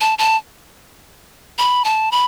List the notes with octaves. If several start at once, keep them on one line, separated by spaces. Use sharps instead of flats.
A5
A5
B5
A5
B5